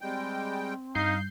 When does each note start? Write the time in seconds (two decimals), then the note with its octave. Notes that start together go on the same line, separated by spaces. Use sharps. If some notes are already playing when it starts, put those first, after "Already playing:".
0.01 G3 G#3 C4 G5
0.95 G2 D#4 F5 G6 C7